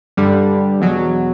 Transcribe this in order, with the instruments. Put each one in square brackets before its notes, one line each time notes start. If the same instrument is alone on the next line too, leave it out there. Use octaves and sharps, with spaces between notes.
[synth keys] G2 D3 G3
E2 B2 F#3